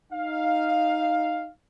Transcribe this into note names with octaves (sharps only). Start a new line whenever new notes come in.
D#4 F5